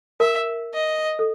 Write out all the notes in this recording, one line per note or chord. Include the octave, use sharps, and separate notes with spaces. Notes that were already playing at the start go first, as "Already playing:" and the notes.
A#4 E5
D#5
A4